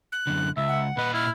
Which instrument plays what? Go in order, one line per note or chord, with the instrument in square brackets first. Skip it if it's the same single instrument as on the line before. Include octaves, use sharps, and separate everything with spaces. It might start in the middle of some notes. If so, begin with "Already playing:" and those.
[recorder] F#6
[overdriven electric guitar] F#2 D3
[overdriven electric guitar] C#2 [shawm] E5
[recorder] F#5
[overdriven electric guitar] A#2 D#5 [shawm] B4
[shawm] E4 [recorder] F6